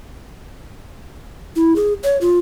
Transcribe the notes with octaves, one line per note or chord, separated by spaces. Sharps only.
E4
G#4
C#5
F4